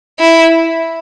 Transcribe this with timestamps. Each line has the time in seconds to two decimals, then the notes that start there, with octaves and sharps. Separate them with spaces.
0.20 E4